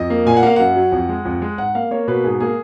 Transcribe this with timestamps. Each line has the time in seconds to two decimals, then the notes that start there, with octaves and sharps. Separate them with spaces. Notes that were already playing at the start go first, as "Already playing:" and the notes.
Already playing: F2 D#5
0.10 A#3
0.26 A#2 G#5
0.37 F#5
0.43 A#3 F5
0.56 F#2 F#5
0.76 F#3
0.92 F2
1.09 G#3
1.25 F2
1.42 G#3
1.58 G#2 F#5
1.75 A#3 F5
1.91 A#3 C#5
2.08 B2 B4
2.24 G#2 G#4
2.40 A#3 G#4